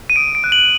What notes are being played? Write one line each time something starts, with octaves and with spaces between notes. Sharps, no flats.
D#7
D#6 D7
D7
F#6
F#7